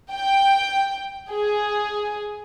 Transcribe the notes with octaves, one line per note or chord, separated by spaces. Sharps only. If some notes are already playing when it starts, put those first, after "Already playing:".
G5
G#4